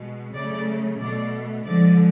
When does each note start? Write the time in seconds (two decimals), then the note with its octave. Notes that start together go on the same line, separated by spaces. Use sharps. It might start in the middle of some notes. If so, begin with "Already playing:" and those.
Already playing: B2 G#3
0.34 C#3 F#3 A3 D5
0.99 B2 A3 D5
1.64 D3 F3 G#3 D5